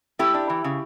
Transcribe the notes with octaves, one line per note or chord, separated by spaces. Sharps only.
A3 E4 G4
D4
E3
C#3